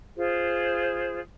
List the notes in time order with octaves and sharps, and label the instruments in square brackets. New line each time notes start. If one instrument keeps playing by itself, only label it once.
[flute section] F4 G#4 C5